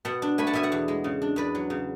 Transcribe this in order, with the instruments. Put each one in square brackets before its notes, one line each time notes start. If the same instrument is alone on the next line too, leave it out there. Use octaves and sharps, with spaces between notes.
[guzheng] B2 F#5 A5
D4
A3 G#5 B5
F#5 A5
B2 E5 G#5
D5 F#5
E2
G#3
C#3
D4
E2 B4 D5
F#3
C#3